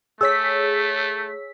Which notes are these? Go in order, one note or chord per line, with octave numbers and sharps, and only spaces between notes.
A3 G#4 C#5 E6 B6